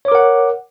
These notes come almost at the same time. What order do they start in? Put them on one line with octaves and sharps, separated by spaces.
C#5 D6 A#4 F#5